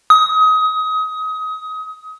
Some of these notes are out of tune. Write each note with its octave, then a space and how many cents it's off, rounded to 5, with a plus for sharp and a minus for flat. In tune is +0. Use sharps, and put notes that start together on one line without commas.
D#6 +25